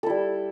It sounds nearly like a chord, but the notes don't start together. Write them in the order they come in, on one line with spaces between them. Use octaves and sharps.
A4 E4 G3